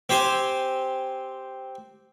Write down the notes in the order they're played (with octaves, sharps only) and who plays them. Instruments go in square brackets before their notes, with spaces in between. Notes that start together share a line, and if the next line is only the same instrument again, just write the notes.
[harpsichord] C4 G4 C5 G#5